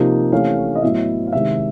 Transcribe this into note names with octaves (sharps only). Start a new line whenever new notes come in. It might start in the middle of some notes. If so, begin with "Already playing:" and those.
Already playing: C3 F3 A#3 D#4
C3 E3 A3 C#4 F5
D#5
A2 F#3 B3 E4 E5
F5
C3 D#3 G#3 E5